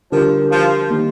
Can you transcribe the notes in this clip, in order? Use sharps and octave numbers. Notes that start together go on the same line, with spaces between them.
D3 F3 G3 D4 G4 A#4
F3
D#3 A#3 D#4 G4